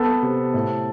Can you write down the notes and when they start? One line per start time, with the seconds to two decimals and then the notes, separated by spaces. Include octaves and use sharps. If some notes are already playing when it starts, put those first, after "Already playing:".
Already playing: B3 A4
0.22 C3
0.54 A2